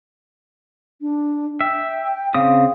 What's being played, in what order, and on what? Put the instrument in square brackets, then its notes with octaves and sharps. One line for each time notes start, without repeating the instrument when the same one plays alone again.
[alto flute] D4
[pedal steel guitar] E5 [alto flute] G5
[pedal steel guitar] C#3 C4 D#6 [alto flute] F5